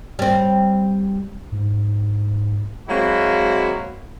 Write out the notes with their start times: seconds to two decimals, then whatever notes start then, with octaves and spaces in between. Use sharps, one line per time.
0.19 G3 C4
1.52 G#2
2.89 F#3 G#3 A#3 C4 E4 F#4